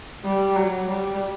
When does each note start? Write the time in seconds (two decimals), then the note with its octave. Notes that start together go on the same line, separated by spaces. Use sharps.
0.24 G3
0.56 F#3
0.88 G3